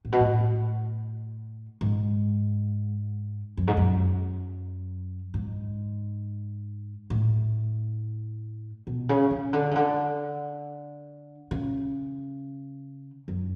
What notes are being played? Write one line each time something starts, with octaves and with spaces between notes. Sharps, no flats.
A2
B2
A2
G#2
F#2
G#2
F#2
G#2
A2
B2
C#3
C#3
D3
C#3
D3
C#3
F#2